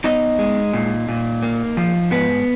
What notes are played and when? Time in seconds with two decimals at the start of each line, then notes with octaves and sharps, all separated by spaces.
0.04 B3 D#4 D#5
0.39 G#3
0.73 A#2
1.09 A#2
1.43 A#3
1.77 F3
2.11 G#2 B3 B4